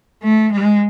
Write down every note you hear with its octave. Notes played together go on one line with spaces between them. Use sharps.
A3
G#3